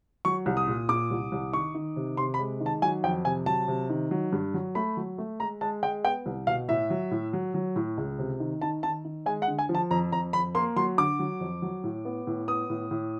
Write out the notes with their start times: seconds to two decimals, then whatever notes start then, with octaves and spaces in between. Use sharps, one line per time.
0.25 F#3 C#6
0.46 C2
0.57 D#6
0.68 A#2
0.89 A#2 D6
1.10 C2
1.32 C2
1.53 D#3 C#6
1.75 D#3
1.96 C3
2.17 C3 C6
2.34 B5
2.39 G#3
2.60 D#3
2.66 A5
2.82 F#3 G#5
3.04 F2 G5
3.25 C3 G#5
3.46 F#3 A5
3.68 C3
3.90 D#3
4.11 F#3
4.32 G2
4.54 F#3
4.75 A3 B5
4.97 F#3
5.18 A3
5.40 G#3 A#5
5.61 G#3 A5
5.83 G#3 G5
6.04 B3 G5
6.26 C2
6.47 B2 F5
6.68 A2 E5
6.90 F#3
7.11 A2
7.33 F#3
7.54 F#3
7.76 A2
7.97 C#2
8.19 C3
8.40 D#3
8.62 D#3 A5
8.83 D#3 A5
9.05 D#3
9.26 G#3 G#5
9.42 F#5
9.48 D3
9.59 G#5
9.69 F3
9.75 A5
9.91 F2 A#5
10.12 F2 A#5
10.33 F2 B5
10.55 A#3 C6
10.76 F#3 C6
10.98 D3 D6
11.19 F#3
11.41 F2
11.62 F#3
11.84 A2
12.05 B3
12.27 A2
12.48 B3 D#6
12.70 A2
12.91 A2